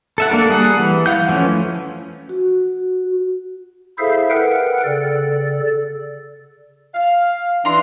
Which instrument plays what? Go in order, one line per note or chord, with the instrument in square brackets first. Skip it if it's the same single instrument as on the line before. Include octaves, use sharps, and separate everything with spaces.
[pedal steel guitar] A4 E5 F#5
A#3 D4 A4 A#4
G3 G#4 F#5
E3
F5 F#5 G6
E3 F3 A3 C#4
[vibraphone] F#4
[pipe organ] E4 G#4 A4 C5 E5 F5
A#4 B4 F#5 G5
C#3 A4 D5
[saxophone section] F5
[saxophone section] E3 D4 [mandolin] A#5 C6